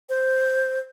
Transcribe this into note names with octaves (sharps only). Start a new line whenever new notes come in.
C5